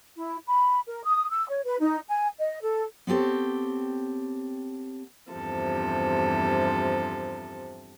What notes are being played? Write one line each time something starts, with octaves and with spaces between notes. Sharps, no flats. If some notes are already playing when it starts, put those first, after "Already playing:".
E4
B5
A#4
D#6
E6
C#5
B4
D#4
G#5
D#5
A4
B3 C4 G4 A4 C#5
E2 G2 C3 F3 A4